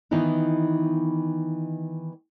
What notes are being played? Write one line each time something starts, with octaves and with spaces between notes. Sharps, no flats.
D#3 E3 B3 D#4 E4